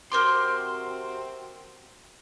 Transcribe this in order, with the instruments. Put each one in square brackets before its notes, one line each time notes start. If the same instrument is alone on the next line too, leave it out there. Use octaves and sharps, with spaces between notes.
[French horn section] C3 C4 F#4 [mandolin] A#4 C5 D6 [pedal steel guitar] C6